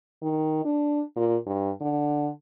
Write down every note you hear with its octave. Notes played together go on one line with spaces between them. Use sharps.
D#3
D4
A#2
G2
D3